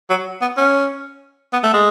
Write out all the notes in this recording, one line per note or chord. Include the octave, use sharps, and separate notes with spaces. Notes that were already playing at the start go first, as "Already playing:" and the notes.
F#3
B3
C#4
B3
A3
G#3